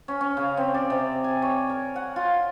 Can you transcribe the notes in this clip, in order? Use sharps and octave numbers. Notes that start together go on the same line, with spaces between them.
C#4
C#4
C#3
C4
D5
C3
G#5
C#5
A#4
F#5
F4